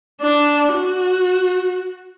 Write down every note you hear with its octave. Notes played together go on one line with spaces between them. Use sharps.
D4
F#4